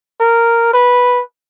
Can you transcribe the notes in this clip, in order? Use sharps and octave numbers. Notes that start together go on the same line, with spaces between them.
A#4
B4